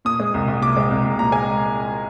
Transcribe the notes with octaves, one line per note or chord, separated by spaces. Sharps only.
A#2 D#6
G#3
C2
C2
A#2 D6
G#3
C2
C2
A#2 A#5
G#3 G#5